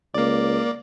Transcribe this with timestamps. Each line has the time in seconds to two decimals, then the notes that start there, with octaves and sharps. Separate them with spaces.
0.14 C#2 A#3 D5